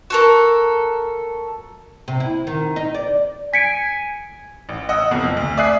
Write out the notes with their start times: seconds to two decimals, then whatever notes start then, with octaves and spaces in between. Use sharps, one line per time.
0.10 F#4 A4 A#4
2.08 C3
2.20 E4
2.47 D#3
2.76 D#4
2.95 D5
3.54 G#5 B6 C#7 D7
4.69 A1
4.89 D#5 F#5 D#6 E6
5.11 F#1 F2 B2
5.37 D2
5.57 D5 E5 G#5 D#6 F#6 C7